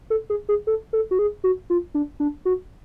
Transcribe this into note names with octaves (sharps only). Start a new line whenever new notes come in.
A4
G#4
G#4
A4
A4
F#4
G#4
F#4
F4
D4
D4
F#4